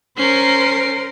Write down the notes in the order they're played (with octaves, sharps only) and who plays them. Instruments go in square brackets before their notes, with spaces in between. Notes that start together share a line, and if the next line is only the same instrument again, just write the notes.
[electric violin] C#4 C7 [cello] A#4 C5